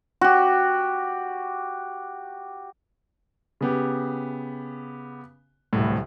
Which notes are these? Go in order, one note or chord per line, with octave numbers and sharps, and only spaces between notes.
F#4 G4
C#3 B3 G4
D1 C2 A2